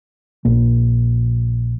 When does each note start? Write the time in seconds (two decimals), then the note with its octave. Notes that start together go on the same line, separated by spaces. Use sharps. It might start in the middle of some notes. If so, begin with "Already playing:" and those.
0.45 A#1 A#3